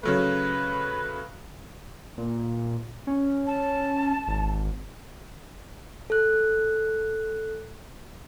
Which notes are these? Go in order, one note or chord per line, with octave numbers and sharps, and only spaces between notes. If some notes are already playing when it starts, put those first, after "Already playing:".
C#3 F#3 A3 B4
A#2
C#4
A5
G#1
A4 F#6